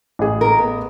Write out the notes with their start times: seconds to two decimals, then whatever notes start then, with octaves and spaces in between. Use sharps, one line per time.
0.19 A1 G#4
0.41 A#4
0.59 B3